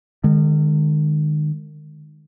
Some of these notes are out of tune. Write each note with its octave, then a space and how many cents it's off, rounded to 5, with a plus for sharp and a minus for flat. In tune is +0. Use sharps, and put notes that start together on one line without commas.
D#3 -35 G#3 +0